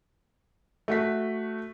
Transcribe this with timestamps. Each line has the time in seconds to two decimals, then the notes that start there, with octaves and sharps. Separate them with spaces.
0.88 A3 F#4 B6